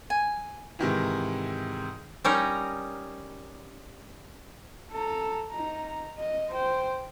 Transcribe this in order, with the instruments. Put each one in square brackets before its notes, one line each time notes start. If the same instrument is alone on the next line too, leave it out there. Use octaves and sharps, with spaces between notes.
[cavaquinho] G#5
[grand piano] G#2 C3 D#3 E3
[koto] G3 C#4 D#4 A#4
[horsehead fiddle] A4 A#5
D#4 A#5
D#5
C5 G5